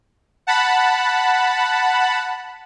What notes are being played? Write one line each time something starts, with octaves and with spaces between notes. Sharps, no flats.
F#5 A5 B5